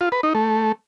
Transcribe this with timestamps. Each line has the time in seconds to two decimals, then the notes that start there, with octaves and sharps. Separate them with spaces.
0.01 F4
0.12 B4
0.23 D#4
0.35 A3